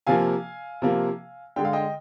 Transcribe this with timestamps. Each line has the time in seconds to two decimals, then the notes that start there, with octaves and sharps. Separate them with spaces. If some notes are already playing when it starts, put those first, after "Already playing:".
0.07 C3 F3 A#3 F5 G#5
0.82 C3 F3 A#3
1.56 D3 G#3 G5
1.65 F5
1.73 D#5 G5